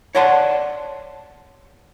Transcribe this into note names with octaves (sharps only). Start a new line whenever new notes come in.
C#5 D5 F#5 A5 C6